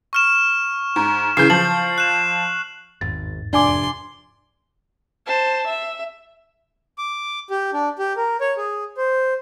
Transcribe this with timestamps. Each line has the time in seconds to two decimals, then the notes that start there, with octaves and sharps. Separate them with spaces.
0.13 C#6 F6 E7
0.96 G#2
1.37 C#3 E3 G6 C7
1.50 F3 F#7
1.98 F#6 E7
3.01 G#1 E2 G#2 A6
3.53 F1 D4 G#5 C6 D6
5.26 C5 A5
5.67 E5
6.98 D6
7.50 G4
7.73 D4
7.99 G4
8.17 A#4
8.41 C#5
8.57 G#4
8.97 C5